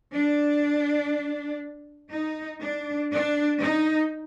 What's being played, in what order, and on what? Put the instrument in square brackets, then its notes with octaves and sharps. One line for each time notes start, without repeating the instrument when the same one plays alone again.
[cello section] D4
D#4
D4
D4
D#4